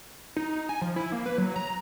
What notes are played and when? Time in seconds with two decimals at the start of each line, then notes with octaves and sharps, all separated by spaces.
0.37 D#4
0.69 G#5
0.82 F3
0.96 E4
1.12 A#3
1.26 B4
1.38 F#3
1.56 A#5